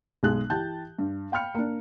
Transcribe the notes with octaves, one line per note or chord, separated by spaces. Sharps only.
B1 G#3 G#4 F#6
E3 G4 A5 G6
G2
F5 G5 B5 F6 C#7
A#3 D4